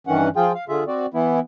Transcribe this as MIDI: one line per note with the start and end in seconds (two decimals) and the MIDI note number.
0.07 0.29 43
0.07 0.29 51
0.07 0.29 52
0.07 0.29 61
0.07 0.29 78
0.36 0.52 53
0.36 0.52 65
0.36 0.52 68
0.36 0.52 79
0.55 0.65 77
0.69 0.84 50
0.69 0.84 65
0.69 0.84 68
0.69 0.84 76
0.87 1.06 60
0.87 1.06 66
0.87 1.06 74
1.14 1.40 52
1.14 1.40 59
1.14 1.40 64